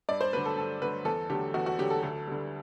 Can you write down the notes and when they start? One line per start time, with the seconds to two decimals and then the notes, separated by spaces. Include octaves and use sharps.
0.09 G2 D5
0.21 C5
0.33 D3 F#3 A3 B4
0.46 A4
0.57 G2 A4
0.82 D3 F#3 A3 B4
1.05 E2 A4
1.30 D3 F#3 A3 G4
1.54 E2 F#4
1.66 F#4
1.78 D3 F#3 A3 G4
1.90 A4
2.02 D2 A4
2.27 D3 G3